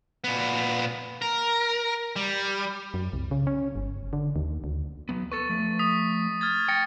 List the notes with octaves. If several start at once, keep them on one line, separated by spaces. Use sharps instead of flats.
A#2 B3
A#4
G3
F#2
C2
C#3
C#4
G1
D3
D#2
D2
F#3 B3
A4 B4 C#6 A6
F3 A3
D#6 B6
F6 G#6 A6
G5 A6 A#6 C#7